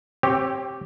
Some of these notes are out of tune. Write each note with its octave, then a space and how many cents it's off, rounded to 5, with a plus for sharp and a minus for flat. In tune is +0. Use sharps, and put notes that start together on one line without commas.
C4 +20 G4 -5 C#5 -10